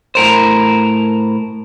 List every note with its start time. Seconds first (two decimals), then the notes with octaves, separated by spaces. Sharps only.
0.15 A2 A#4 C5